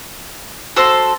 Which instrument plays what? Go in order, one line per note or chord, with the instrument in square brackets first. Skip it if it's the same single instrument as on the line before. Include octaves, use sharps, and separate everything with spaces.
[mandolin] F#4 A4 C5